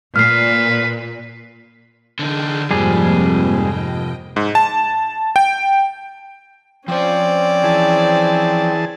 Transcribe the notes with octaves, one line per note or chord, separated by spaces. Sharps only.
A#2 B4 F6 C7
D3 D#4 G#4 G5 C6
F2 G#2 C3 F3 G3 A#3 G#4 C5
D#5 G5
G#2
A5
G5
F3 C4 C#4 C5 D5
E3 G#4 A5